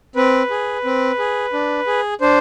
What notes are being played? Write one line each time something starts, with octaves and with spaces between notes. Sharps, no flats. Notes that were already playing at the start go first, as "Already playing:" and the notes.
C4 B4
G#4
C4
G#4
D4
G#4
D4 C5